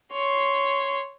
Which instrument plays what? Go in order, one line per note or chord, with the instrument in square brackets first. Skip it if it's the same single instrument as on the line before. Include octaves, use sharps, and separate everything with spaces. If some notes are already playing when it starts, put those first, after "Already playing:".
[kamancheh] C#5 C6